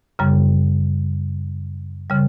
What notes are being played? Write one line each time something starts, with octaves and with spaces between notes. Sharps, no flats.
F#2 C#3 G3
C#3 G3